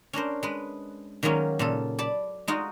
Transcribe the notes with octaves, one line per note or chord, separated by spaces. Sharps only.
C#4 D4 A#4 C5
G#3 B4
D#3 F#3 G#3 A#3 C#4
A#2 C#3 A4
D5 A5 B5
G#3 D#4 F4 F#4